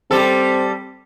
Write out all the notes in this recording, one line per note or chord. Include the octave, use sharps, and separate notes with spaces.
G3 C4 A4